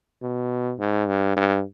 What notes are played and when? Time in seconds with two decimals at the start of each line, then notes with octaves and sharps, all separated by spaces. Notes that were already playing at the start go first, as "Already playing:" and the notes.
0.22 B2
0.79 G#2
1.08 G2
1.37 G2